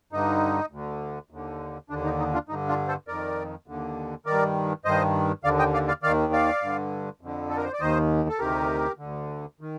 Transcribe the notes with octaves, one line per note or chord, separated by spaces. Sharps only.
G2 D3 D#4
D2 D3
D#2 D3
D#2 D3 D4
D#4
D#4
D4 F4
G2 D3 D#4
D4 F4
A4 C5
F2 D#3 A#4 D5
D#2 D3
G2 D#3 A#4 D5
G2 D#3 C5 D#5
D#2 D3 D5 F5
D#5 G5
D5 F5
D5 F5
D#2 D#3 D5 F5
D5 F5
G2 D3
F2 D3
A4
A#4
C5
D5
D#2 D#3 C5 D#5
A4
D2 C3 D#3 G4 A#4
D2 D3
D#3